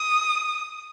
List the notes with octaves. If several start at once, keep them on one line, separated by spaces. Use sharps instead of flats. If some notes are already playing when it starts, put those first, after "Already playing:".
Already playing: D#6